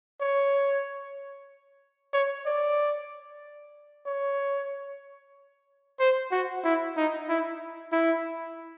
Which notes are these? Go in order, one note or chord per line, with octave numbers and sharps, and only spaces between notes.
C#5
C#5
D5
C#5
C5
F#4
E4
D#4
E4
E4